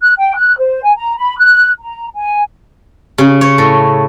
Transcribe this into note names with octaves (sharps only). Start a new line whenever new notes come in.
F#6
G5
F#6
C5
G#5
A#5
B5
F#6
A#5
G#5
C#3
C#5
A2